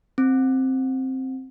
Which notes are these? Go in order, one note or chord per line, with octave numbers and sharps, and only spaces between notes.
C4